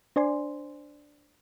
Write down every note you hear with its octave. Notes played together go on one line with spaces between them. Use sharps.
D4 C5 D5 G#5 C6